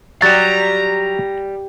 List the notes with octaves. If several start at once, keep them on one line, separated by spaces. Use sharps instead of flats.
F#3 G3 F#4 A#5 A6